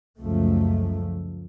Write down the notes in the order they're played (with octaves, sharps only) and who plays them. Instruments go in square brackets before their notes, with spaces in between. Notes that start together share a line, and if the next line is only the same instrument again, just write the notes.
[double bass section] C#2 F#2 F3 A3